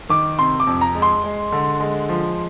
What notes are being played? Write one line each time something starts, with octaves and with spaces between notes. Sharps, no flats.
D#3 D6
C3 C6
D6
F2
A#5
G#3
C6
G#3
D3
G#3
F3